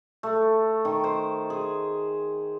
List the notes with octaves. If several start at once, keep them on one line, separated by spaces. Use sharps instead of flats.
A3
D#3
C5
G#4